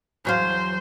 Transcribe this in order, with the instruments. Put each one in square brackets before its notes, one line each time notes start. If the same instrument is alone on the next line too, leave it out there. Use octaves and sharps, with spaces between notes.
[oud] E2 F#3 F5 [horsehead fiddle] C5